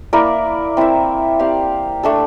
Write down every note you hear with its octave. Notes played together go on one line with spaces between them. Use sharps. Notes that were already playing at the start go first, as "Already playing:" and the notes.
A#3 E4 A#4 D5
C4 E4 A#4 E5
C4 G4 D5 F5
A3 D4 A4